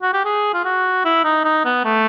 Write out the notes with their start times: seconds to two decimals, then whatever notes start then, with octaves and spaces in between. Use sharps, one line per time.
0.02 F#4
0.13 G4
0.25 G#4
0.54 F4
0.65 F#4
1.05 E4
1.24 D#4
1.44 D#4
1.65 B3
1.84 A3